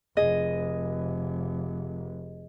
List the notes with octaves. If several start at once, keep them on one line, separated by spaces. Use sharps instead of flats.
F1 G#4 D#5